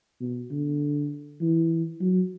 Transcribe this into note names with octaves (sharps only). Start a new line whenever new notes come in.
B2
D3
E3
F#3